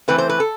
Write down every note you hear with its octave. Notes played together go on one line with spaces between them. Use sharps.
E3 A3 C4 B4
C5
B4
A4